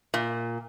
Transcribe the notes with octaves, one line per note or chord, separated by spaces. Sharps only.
A#2